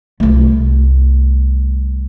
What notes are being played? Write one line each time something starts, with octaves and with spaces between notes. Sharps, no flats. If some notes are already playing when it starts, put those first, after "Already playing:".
C2 A3